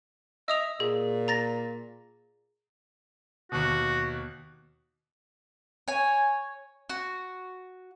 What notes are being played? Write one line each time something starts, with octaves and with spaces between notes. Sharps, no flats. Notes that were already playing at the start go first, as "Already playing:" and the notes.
D#5 E5 D#6 F7
A#2 G#4
A#5 A6 A#6
D#2 B2 F#4
C#5 G#5
F#4